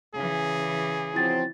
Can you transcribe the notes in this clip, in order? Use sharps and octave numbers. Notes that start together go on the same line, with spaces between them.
C#3 E3 G#4
F3 F#3 C4 E4 A6